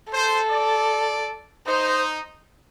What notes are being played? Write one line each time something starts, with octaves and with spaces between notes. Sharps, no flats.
A4 C5
D5
D#4 C5